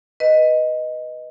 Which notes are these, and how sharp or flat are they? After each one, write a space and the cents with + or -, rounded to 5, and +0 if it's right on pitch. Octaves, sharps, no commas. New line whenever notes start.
B4 +0 D#5 +0